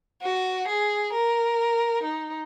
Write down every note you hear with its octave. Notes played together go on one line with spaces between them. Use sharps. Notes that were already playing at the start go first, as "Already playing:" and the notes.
F#4
G#4
A#4
D#4